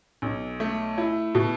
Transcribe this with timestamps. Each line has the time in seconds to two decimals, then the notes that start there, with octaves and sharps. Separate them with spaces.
0.22 B1
0.60 A3
0.98 E4
1.35 B2